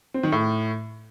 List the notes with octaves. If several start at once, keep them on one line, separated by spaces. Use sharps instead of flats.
C4
D#3
A2